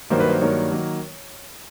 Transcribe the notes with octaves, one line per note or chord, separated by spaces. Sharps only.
G2 D#3 F#3 A#3 C5
B4
C5
G2 D#3 F#3 A#3 C#5
D#3 F#3 A#3